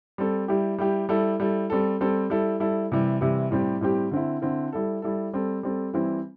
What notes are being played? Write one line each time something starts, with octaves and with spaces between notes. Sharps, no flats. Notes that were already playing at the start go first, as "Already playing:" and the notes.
G3 C4 A4
G3 E4 G4
G3 E4 G4
G3 E4 A4
G3 E4 A4
G3 C4 A4
G3 C4 A4
G3 E4 A4
G3 E4 A4
C3 E3 G3 E4
C3 E3 G3 E4
A2 G3 C4 G4
A2 G3 C4 G4
D3 C4 E4
D3 C4 E4
G3 E4 A4
G3 E4 A4
G3 C4 A4
G3 C4 A4
E3 G3 C4 E4